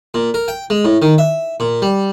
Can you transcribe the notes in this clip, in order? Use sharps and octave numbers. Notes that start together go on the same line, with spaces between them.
A#2
A#4
G5
G#3
A2
D#3
E5
A#2
G3